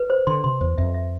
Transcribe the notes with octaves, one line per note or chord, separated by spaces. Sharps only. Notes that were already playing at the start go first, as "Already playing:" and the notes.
Already playing: B4
C5
D3 C6
C3 C6
E2 C5
F2 E5
E5